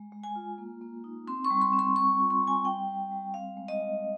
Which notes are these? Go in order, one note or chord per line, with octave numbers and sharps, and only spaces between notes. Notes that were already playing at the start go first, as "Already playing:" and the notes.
Already playing: G#3
G#3
G#5
F4
A#3
A#3
D#4
C4 C6
C#6
G3
C6
C4
C6
G3 C#6
F4
C6
G3
G#5
G3 G5
G3
G3
C4 F5
G#3
D#5
G#3